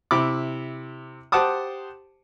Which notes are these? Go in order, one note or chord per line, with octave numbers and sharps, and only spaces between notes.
C3 E4 B5 D6
G4 C5 F#5 A5 D6 D#6